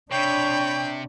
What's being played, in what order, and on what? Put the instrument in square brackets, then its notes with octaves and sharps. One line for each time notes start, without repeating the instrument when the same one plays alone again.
[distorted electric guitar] C3 [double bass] D4 [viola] C#5 B5 [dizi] G5